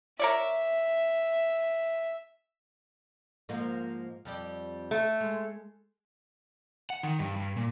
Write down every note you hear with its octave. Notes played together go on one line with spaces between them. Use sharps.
A#4 C#5 D5 E5
G#2 F3 A#3
F2 G3 D5
A3
G#3
F#5
D#3
G2
G2
A#2